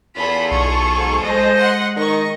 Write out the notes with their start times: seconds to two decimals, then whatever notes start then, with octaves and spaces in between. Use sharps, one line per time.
0.17 E2 F4 G#4 A4 B5
0.51 B1 C#6
0.95 G#2
1.24 G#3 C5 D#5
1.57 F#5 C6 C#7
1.97 D#3 D#5 C#6